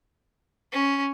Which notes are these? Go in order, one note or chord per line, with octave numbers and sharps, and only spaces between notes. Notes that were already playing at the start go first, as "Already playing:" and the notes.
C#4